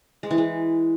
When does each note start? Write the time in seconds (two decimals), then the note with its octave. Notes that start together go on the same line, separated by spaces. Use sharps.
0.23 G#3
0.31 E3
0.38 G#3